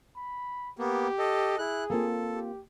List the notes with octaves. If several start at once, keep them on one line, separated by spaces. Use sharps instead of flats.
B5
A#3 B3 G4
A4 D#5
E4 G#4 F#6
A#3 C4 F4 A4
G4